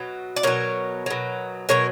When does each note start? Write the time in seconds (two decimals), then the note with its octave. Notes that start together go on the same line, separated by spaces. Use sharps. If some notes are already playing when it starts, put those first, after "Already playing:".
Already playing: B2 F#3
0.36 D5
0.43 B2 F#3 A#4 C#5
1.06 B2 F#3
1.69 B2 F#3 A#4 C#5